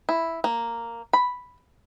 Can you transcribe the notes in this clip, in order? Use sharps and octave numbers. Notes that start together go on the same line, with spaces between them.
E4
A#3
B5